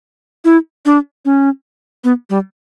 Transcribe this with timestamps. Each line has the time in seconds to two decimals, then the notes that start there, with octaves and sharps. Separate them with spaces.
0.45 E4
0.86 D4
1.25 C#4
2.04 B3
2.30 G3